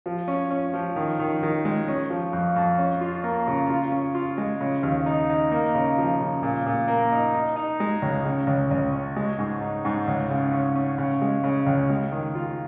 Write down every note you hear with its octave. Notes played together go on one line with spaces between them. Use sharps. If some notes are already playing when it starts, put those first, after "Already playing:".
F3
C#4
C#4
F3
D#3
D#3
D#3
G#3
C#4
F3
F2
F2
C#4
F4
A#3
C#3
F4
C#4
F4
G#3
C#3
D#2
D#4
D#4
A#3
C#3
F3
C#3
A#2
A#2
A#3
D#4
D#4
D#4
G#3
C#2
C#3
C#2
C#2
C#4
G#3
G#2
D#4
G#2
C#2
C#3
C#4
C#4
C#3
G#3
C#3
C#2
G#3
D#3
F4